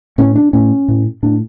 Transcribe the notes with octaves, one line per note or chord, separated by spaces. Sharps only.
A2 C#4
D4
A2 C#4
A2
A2 D4